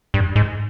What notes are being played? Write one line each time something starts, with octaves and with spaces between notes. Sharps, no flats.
G2
G#2